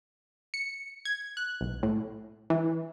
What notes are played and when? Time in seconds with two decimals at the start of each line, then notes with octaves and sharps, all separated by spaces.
0.54 C#7
1.05 G#6
1.37 F#6
1.61 B1
1.83 A2
2.50 E3